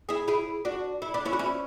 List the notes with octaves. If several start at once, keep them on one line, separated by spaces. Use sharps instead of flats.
E4 G#4
E4 G#4
D4 F#4
E4
D4
C#4 E4
F#4
C#4 E4